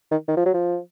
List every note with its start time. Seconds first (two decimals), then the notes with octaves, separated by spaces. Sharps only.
0.11 D#3
0.28 D#3
0.37 F3
0.45 F#3
0.54 F3